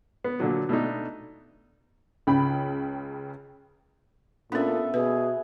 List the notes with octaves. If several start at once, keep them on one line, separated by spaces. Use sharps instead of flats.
B3
A#2 D3 F#3
B2 A3 D4 D#4
C#2 C#3 G5 B5
A#2 B3 C#4 D4 A4 E5
B2 G#4 B4